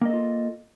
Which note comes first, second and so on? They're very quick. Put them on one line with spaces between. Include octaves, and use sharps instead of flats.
A#3 D#5 A4 F4